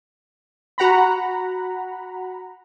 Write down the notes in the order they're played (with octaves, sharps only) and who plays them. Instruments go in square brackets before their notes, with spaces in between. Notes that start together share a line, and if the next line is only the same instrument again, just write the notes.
[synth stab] F#4 F#5 A#5 B5